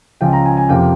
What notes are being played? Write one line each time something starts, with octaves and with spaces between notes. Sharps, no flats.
C#2 C#3 F3 G5
A#5
G#5
G#5
F2 C3 F3 A#3 G5